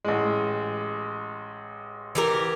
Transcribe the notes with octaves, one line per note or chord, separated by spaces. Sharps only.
A1 G#3
E3 G4 A#4